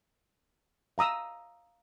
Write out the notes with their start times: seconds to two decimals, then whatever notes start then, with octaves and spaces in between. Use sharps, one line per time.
0.98 F5 A#5 D#6 E6